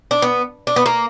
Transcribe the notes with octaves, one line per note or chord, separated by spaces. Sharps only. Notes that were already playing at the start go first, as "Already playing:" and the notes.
D4
B3
D4
B3
A#3